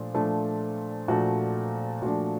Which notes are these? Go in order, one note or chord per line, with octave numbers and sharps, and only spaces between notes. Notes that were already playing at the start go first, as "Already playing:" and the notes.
Already playing: A#2 F3 A3 D4
A#2 F3 A3 D4
A#2 F3 A3 D4 F#4
A#2 F3 A3 D4 F#4